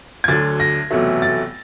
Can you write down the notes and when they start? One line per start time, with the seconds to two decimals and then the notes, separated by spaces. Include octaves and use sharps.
0.24 G#6
0.28 D2 D3 F#3 A6
0.60 A#6
0.90 F1 E2 B2 F#3 A3
1.22 A6